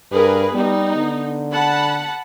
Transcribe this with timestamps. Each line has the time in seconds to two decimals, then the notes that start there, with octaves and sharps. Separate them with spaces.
0.12 G2 G#4 A#4 B4
0.55 G3 B3 D#4
0.96 D3
1.54 F#5 A5 B5